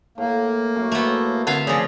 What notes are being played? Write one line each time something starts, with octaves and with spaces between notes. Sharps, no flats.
A2 A#3
F#2
A3 B3
D3 A3 C4 F4 E5 F5
C#3 F3 G#4 D5